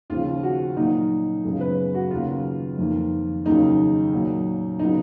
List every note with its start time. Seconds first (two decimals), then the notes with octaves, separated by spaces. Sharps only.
0.10 D#2 C#3 F3 F4
0.43 F#4
0.76 A#2 F#3 A#3 D#4
1.44 F#2 C#3 G#3 B3
1.61 B4
1.95 F#4
2.11 D#2 C#3 F#3 A#3 F4
2.78 F2 D#3 A#3
3.45 D#2 C#3 F#3 A#3 D#4
4.13 A#2 F#3 A#3
4.79 C#3 F#3 B3 D#4